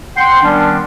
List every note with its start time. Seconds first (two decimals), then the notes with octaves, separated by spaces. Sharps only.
0.17 F#5 G5 C6
0.43 D#3 G3 B3 C#4 D4